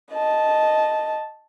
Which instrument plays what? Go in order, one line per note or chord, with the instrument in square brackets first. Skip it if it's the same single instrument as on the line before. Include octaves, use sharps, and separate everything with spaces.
[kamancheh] D#5 A5